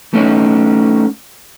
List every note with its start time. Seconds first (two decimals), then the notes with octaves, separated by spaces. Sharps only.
0.13 A3 C#4 D#4